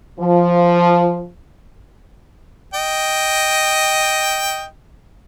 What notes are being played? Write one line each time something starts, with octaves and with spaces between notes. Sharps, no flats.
F3
D#5 G5